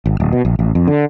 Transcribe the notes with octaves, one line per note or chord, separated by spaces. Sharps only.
G#1
D1
B2
A#1
A1
F2
D3